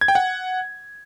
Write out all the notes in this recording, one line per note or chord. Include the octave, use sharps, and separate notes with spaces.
G#6
G5
F#5